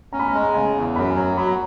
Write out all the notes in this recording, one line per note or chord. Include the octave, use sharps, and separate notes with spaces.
C#4 A#5
B5
A#5
G#3
A#5
C#3 G#5
E2
F#2 B5
A#5
G#5
F#3 A#5
F#3 B5
A#5